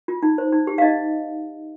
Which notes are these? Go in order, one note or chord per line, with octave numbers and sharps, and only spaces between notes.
F4
D#4
C5
D#4
G4
F5
D#4 D#5